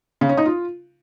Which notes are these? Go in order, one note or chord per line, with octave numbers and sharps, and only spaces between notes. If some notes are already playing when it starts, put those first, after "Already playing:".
C#3
C#4
D#4
F4